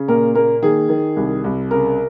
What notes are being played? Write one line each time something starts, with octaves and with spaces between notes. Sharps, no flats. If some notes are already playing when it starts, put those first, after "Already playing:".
Already playing: C#3
A#2 A#4
A#3 A#4
D#3 G#4
D#3
C2
C2
C#3 A#4